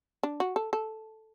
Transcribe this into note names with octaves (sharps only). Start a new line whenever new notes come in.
D4
F#4
A4
A4